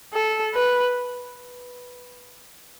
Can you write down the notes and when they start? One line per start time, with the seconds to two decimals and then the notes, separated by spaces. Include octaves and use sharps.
0.14 A4
0.55 B4